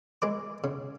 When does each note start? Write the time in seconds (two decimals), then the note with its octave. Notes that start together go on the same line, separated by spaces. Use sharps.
0.22 G#3 B4 D6
0.64 C#3